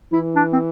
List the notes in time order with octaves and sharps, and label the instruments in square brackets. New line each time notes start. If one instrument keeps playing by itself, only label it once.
[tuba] E3 [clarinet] E4
[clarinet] D4
C4